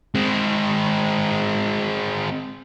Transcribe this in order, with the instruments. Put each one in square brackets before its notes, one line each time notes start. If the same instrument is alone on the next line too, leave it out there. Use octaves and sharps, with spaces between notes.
[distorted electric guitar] G#3 C4